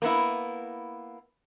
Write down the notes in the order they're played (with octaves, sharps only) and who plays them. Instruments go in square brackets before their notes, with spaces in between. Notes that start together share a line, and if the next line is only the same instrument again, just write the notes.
[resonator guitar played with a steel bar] A#3 B3 E4